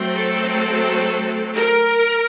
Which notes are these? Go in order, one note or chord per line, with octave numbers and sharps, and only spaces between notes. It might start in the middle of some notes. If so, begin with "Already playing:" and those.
Already playing: F#3 A3 C4
A4
A#4